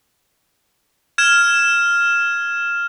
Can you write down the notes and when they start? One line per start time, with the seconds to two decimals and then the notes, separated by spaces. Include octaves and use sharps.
1.18 F6 G#6 E7